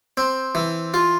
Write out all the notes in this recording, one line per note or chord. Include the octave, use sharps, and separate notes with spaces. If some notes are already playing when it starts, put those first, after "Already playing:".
C4
E3
F4